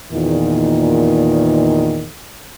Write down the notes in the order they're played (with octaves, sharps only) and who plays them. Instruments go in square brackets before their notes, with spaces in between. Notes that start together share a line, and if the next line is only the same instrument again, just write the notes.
[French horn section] E2 A#2 D#3